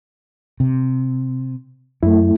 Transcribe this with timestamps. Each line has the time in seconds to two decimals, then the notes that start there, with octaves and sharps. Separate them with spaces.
0.60 C3
2.03 F#2 A3 E4